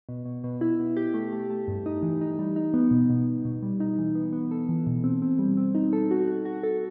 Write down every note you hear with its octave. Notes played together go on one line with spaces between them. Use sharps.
B2
B2
B2
E4
B2
G4
A3
A3
A3
G2
D#4
E3
D#4
G3
D#4
B3
B2
B2
B2
B2
G3
D#4
E3
B3
B3
A4
E3
B2
C4
C4
G3
C4
D#4
A4
F#4
F#4
F#4
A4